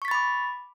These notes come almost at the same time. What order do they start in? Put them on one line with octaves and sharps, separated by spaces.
C#6 B6 A6 B5 D6